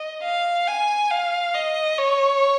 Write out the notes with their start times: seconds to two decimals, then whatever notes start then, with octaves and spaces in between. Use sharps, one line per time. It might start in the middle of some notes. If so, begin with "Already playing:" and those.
Already playing: D#5
0.23 F5
0.67 G#5
1.11 F5
1.54 D#5
1.98 C#5